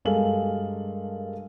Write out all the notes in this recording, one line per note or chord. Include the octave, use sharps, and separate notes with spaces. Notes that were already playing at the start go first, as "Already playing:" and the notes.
G2 G#3 A4 A#4 F5 F#7